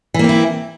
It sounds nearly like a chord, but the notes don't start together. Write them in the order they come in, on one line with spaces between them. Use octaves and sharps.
E3 A#3 C4 E4